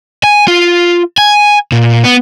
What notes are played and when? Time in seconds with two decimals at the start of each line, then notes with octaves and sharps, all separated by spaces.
0.24 G#5
0.48 F4
1.18 G#5
1.72 A#2
2.04 B3